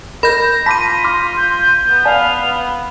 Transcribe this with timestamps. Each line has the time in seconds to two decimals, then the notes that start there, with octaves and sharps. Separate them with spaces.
0.23 A#4 D#5 B5 G6 A#6
0.66 F4 A5 B5 D6 A#6 B6 D#7
1.04 C6 D6 F6
1.37 G6
1.89 B3
2.05 D5 F5 G#5 A5